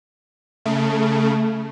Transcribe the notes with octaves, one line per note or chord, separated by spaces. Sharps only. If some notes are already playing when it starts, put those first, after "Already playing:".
C#3 A3